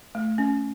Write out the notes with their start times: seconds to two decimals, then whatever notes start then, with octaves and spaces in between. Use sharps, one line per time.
0.15 A3
0.38 C#4